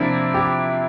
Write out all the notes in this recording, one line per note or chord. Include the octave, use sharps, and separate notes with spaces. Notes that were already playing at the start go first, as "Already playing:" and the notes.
Already playing: C3 F3 A#3 C4 D4 E4
G4